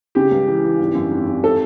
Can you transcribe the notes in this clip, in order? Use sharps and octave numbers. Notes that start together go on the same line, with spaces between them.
C#3 G4
C#2
E3
E3
G#1
F#2
G#1
G#1
A4